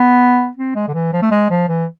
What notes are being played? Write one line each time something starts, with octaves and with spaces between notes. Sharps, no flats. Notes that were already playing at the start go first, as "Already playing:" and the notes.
Already playing: B3
C4
G#3
D3
E3
F3
A3
G#3
F3
E3